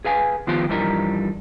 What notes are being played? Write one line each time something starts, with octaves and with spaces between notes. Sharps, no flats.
G#4 B4 F5 G#5
D#3 F3 B3 F4 G4 C5
G2 E3 F3 G3 D#4 A#4